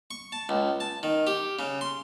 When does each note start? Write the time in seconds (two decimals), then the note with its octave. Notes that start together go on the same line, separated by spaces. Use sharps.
0.11 C#6
0.32 A5
0.49 C#2
0.80 A5
1.03 D#3
1.27 G4
1.59 C#3
1.81 C6